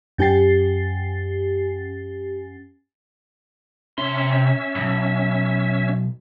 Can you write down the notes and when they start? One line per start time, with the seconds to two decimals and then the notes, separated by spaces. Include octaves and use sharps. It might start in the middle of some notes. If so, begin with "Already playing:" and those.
0.18 F#2 C#4 G4 G#5 A6 C7
3.98 C3 C#4 E5 C6
4.75 B1 G2